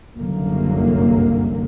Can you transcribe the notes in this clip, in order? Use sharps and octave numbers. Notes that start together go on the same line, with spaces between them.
F#1 C2 F#2 D3 A#3